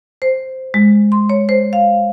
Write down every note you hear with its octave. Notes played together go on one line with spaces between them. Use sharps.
C5
G#3
C6
C#5
C5
F5